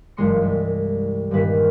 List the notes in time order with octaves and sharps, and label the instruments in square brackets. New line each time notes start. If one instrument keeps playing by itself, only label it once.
[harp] F#1 G2 E3 G#3 C6 C#7
C2
G2 A#2 D#3 G3 B4